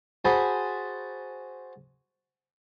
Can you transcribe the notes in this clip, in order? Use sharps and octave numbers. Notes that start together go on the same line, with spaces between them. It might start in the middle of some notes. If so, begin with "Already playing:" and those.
F#4 G#4 C5 G#5 A5 B5